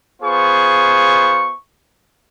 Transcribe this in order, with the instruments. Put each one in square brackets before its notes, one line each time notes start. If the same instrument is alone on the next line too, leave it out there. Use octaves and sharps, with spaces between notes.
[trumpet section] B3 F4 G#4 C5 C#6